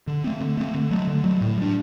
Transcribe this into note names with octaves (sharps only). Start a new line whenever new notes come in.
D3
A3 C4
D3
A3 C4
D3
F#3 A3
D3
F#3 A3
A2
G3 D4